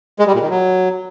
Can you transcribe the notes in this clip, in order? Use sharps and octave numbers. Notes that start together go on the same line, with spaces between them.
G#3
G3
A#2
D#3
F#3